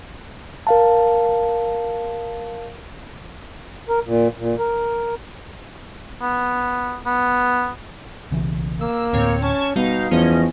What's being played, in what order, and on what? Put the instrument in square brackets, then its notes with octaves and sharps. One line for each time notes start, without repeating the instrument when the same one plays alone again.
[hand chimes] A#4 F5 A5
[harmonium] A#4
A#2
A#2
A#4
[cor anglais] B3
B3
[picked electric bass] B1 C#3 E3
[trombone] A#3 [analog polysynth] E6
[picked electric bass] D2 A2 [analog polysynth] C4 C#5
[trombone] C#4 [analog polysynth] A5 C#6 G#6
[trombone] B2 [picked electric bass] G3 B3 [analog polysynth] D#4 F5
[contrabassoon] E2 [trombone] F3 [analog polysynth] C#4 D#5